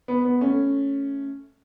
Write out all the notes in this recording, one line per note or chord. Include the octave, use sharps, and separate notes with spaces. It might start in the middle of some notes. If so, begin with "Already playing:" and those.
B3
B3
A3 C#4